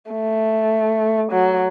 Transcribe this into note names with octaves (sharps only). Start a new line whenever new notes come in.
A3
F#3